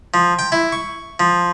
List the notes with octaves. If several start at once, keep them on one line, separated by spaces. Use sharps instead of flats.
F3
G5
E4
C#6
F3